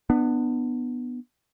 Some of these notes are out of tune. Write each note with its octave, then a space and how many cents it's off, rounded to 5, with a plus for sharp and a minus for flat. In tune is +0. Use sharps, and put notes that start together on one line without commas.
B3 +0 D4 +30